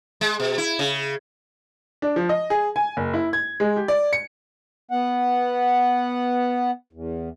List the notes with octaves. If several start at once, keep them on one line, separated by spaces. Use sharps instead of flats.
G#3
B2
E4
C#3
D4
F3
D#5
G#4
G#5
F#1
E4
G#6
G#3
G4
D5
C#7
B3 F#5
E2